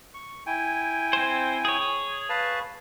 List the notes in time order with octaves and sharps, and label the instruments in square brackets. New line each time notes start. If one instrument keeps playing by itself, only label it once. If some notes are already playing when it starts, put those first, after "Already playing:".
[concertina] C#6
E4 G5 G#5
[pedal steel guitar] C4 C5
G#4 C#5
[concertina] B4 F5 A5